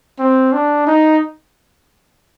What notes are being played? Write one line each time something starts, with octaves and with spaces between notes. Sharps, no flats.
C4
D4
D#4